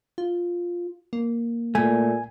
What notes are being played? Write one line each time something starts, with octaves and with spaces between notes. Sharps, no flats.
F4
A#3
A#2 A3 G#5